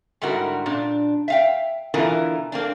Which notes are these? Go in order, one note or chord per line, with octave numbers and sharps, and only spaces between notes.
G#2 D3 G3 E4 F#4 A#4
A#2 D4
E5 F5 G5
B2 D3 E3 E4 F4 A#4
A#3 C4 D4